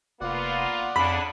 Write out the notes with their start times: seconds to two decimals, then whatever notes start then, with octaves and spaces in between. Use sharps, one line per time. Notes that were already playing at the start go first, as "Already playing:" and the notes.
0.21 F1 A#3 B3 F4 D5 F#5
0.96 F2 C#3 D4 B5